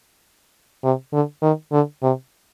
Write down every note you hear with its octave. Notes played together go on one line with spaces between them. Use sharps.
C3
D3
D#3
D3
C3